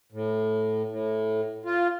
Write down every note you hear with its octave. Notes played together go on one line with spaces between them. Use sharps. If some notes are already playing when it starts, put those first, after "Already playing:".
A2
A2
F4